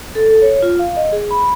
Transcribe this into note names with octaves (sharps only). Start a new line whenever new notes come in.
A4
A4
C#5
F4
F5
D#5
G#4
B5